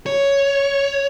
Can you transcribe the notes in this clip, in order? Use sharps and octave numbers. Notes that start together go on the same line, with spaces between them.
C#5